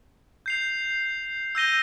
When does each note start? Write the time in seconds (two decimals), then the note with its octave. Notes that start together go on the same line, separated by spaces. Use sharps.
0.46 G6 C7 F7
1.55 E6 G6 A#6 D#7 G7